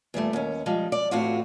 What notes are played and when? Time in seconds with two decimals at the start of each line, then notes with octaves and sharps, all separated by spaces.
0.14 E2 A#2 G3 A3
0.33 D#2 C#4
0.66 F3 G3 G#3
0.92 D5
1.11 E2 A2 C4 F4 F#4